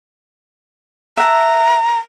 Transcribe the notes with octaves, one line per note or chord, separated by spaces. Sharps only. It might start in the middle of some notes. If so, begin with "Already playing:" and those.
E5 F#5 A5 A#5